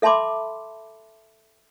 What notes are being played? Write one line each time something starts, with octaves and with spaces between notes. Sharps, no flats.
A4 E5 A5 B5 C6 D6